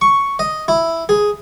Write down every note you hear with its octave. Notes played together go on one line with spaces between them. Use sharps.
C#6
D#5
E4
G#4